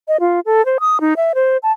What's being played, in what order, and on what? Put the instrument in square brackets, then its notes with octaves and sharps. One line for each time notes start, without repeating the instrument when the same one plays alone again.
[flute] D#5
F4
A4
C5
D#6
D#4
E5
C5
A5